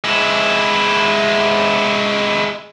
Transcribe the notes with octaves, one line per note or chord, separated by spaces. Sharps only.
G#3 E4